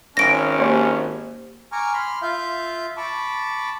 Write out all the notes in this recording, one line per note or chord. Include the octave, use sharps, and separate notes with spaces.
G#1 C#4 A#6 D7
A#3 G4 C5
G#5 A#5 C#6 D6 F6
B5 C6 F6
F4 E5 F5 G6
A5 B5 C#6 D6